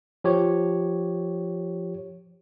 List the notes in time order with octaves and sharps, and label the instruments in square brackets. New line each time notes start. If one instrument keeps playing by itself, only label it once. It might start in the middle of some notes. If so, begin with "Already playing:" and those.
[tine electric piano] F3 G4 C#5